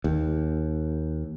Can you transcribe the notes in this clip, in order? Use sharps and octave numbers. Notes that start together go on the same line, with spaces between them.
D#2